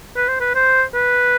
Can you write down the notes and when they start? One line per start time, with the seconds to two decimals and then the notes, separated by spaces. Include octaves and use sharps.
0.17 B4
0.28 C5
0.40 B4
0.55 C5
0.95 B4